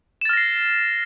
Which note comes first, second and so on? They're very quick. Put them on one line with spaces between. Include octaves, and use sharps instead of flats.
E7 A6 F6 A#6 C7